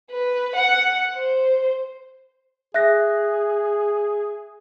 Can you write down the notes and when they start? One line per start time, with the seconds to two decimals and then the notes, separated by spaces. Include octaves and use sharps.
0.11 B4
0.56 F#5
1.15 C5
2.74 G#4 E5 F#6 A#6